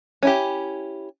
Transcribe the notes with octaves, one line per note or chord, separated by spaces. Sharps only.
C#4 E4 G4